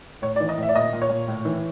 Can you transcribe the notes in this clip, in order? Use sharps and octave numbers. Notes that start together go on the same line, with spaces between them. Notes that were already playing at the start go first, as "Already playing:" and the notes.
A2 C#5
D5
E3
D#5
A2
E5
D5
A#2 D#5
A#2
C#5
A#2
A2
E3